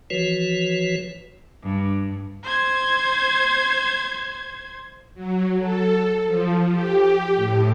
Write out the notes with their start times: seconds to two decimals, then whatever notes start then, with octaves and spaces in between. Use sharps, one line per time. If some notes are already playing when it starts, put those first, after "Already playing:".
0.10 E3 F3 F#4 B4 C#5
1.62 G2
2.43 C5 G#6
5.14 F#3
5.58 A4
6.24 F3
6.70 G4
7.35 A2